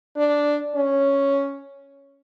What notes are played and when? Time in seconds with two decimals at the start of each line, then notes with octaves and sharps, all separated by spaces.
0.16 D4
0.76 C#4